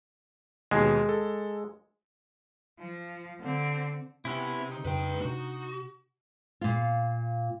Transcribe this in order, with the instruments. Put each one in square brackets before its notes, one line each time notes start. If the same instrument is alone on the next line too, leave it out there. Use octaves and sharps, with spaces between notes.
[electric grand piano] D#2 B2 [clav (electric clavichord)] G#3
[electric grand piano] A4
[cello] F3
D3 C4
[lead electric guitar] C3 [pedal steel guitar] B3 C#4 E4
[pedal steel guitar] D#4
[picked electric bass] F2 C#3 [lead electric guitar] B4 G5
[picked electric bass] C3 D4 [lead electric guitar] F#4
[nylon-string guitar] A#2 F4